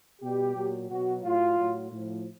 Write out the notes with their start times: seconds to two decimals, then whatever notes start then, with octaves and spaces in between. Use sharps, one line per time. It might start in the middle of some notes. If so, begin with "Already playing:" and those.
0.21 B2 G3 G4
0.55 A#2 F#3
0.89 B2 F#3 F#4
1.23 A2 F#3 F4
1.58 A2 F#3
1.92 A2 F3